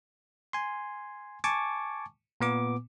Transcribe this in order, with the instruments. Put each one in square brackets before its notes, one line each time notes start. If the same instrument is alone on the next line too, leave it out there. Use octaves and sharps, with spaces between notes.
[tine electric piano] G#5 C6
G#5 A5 C#6 D6
A#2 B3 D6